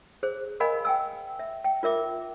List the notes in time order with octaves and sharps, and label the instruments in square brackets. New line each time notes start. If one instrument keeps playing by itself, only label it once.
[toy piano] G#4 C5
A#4 D#5 F5 G#5 B5
G5 G#5 E6
E5
G5
F4 A#4 E5 D6